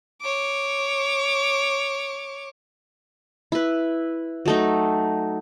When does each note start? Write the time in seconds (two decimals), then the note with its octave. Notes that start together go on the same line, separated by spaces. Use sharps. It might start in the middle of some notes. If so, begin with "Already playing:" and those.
0.22 C#5 D6
3.52 E4 B4
4.46 F#3 A3 D#4